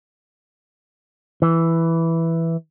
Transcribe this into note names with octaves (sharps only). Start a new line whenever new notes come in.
E3